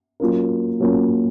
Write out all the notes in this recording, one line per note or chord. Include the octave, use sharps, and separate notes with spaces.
F#3 A#3 C#4 F4 A#4
F#3 A#3 C#4 F4 A#4